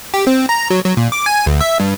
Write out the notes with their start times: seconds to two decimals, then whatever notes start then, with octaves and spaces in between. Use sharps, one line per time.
0.14 G4
0.27 C4
0.49 A#5
0.70 F#3
0.85 F#3
0.97 A#2
1.12 D6
1.26 G#5
1.46 D2
1.61 E5
1.80 G2